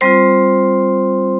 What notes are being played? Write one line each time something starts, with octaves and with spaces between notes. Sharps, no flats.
G3 C4 F4 C5 C6